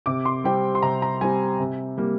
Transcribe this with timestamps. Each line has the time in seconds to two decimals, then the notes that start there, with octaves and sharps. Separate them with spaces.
0.06 C3 D6
0.25 C6
0.44 G3 C4 G5
0.75 C6
0.82 C3 A#5
1.02 A#5
1.21 G3 C4 G#5
1.60 C3
1.97 G3 A#3